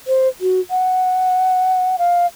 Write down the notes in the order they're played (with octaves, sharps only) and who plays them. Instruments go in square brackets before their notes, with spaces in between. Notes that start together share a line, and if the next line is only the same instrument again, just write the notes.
[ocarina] C5
F#4
F#5
F5